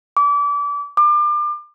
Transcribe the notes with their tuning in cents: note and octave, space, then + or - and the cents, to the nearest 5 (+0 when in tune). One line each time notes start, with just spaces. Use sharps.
D6 -30
D6 +35